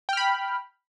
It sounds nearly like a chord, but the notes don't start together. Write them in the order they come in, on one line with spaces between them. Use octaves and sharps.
G5 F6 B5